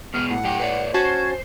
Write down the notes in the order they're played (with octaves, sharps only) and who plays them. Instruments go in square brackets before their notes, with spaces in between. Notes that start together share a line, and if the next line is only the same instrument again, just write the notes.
[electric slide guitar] B2 G#3 B3 [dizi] F6
[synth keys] A2 [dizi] F#5
[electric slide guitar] F#2 G4 G5
B4 C#5 D5
[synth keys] C#4 F#4 A5 [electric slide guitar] C5 [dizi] G#6